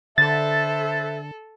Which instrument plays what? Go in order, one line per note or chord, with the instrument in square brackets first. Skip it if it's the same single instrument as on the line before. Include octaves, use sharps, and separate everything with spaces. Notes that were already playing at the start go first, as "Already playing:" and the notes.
[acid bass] D3 [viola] A4 [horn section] B4 C5 E5 [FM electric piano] A6